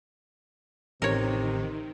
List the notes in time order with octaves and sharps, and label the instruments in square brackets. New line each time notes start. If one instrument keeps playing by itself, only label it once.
[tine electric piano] A1 [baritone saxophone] C3 [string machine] D#3 [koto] A#4 C#5